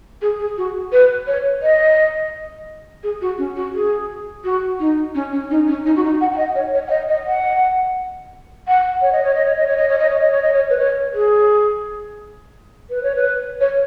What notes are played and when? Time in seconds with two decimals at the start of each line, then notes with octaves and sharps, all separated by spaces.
0.21 G#4
0.39 G#4
0.57 F#4
0.92 B4
1.27 C#5
1.62 D#5
3.03 G#4
3.21 F#4
3.38 C#4
3.55 F#4
3.74 G#4
4.44 F#4
4.80 D#4
5.14 C#4
5.32 C#4
5.50 D#4
5.67 C#4
5.85 D#4
5.96 F#4
6.03 D#4
6.20 F#5
6.32 F#5
6.37 D#5
6.55 C#5
6.74 C#5
6.87 F#5
6.90 D#5
7.08 D#5
7.25 F#5
8.67 F#5
9.01 C#5
9.12 D#5
9.23 C#5
9.34 D#5
9.45 C#5
9.56 D#5
9.66 C#5
9.77 D#5
9.89 C#5
9.98 D#5
10.09 C#5
10.20 D#5
10.31 C#5
10.42 D#5
10.52 C#5
10.70 B4
10.78 C#5
11.13 G#4
12.89 B4
13.03 C#5
13.15 B4
13.60 C#5